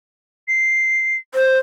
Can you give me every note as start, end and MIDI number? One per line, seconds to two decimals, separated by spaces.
0.48 1.17 96
1.35 1.58 72